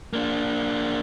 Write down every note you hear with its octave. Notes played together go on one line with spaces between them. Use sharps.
A#3 D4